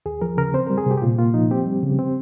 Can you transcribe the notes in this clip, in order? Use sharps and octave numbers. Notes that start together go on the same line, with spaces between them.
D#2 G#4
F3 A#4
C#3 A#4
C4 C5
G3 A#4
G#4
C3 G4
G4
A#2 F4
A#3 F4
F3 D#4
C4 G4
G3
C#3
C4